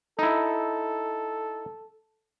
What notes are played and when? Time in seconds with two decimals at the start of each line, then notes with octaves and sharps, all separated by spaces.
0.19 D#4 E4 A4